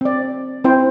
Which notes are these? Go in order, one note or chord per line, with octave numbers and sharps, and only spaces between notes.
C4 D5
C4 E4 C5 G5